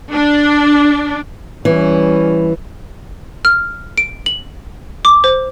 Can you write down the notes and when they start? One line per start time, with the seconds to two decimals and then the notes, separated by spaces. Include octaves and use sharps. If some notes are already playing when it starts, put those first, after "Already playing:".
0.13 D4
1.65 E3 G3 C#4
3.45 F6
3.98 D7
4.26 F#7
5.05 D6
5.24 C5